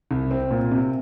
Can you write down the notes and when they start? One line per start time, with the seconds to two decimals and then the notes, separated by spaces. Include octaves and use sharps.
0.11 C2
0.31 C4
0.51 A#2
0.71 C3